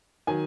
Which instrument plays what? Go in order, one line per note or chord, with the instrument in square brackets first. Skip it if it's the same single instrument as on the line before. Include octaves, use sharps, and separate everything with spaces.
[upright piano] D#3 F#3 G#5